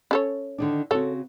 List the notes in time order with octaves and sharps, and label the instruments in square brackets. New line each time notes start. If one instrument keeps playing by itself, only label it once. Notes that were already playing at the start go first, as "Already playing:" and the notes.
[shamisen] C#4 A4 C#5
[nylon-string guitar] D3 D#3 D4
[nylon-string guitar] C#3 C4 F#4 [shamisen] A4 C#5